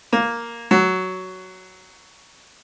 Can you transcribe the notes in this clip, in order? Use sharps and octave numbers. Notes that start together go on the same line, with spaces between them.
A#3
F#3